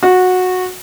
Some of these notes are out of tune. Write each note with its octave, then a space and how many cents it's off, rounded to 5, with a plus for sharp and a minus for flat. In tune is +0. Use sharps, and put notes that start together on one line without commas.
F#4 -15